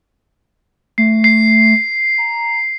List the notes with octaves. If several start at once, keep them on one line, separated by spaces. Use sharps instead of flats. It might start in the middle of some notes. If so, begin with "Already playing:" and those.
A3 C7
C7
A#5